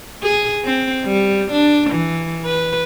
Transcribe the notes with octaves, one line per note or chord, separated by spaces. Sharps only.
G#4
C4
G3
D4
E3
B4